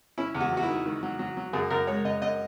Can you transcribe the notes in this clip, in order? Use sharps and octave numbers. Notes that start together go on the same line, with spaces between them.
C#4 E4
E2
F#4
F#3
F#4
E4
D#3
D#3
F#3
F#3
F#3
F#2 G#4
F#2 A#4
G#3 C#5
F#2 D#5
F#2 D#5